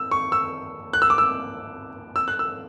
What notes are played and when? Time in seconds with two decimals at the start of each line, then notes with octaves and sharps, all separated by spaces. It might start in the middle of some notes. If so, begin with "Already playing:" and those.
Already playing: E6
0.11 C#6
0.32 E6
0.93 F#6
1.02 E6
1.10 D6
1.18 E6
2.16 E6
2.28 F#6
2.39 E6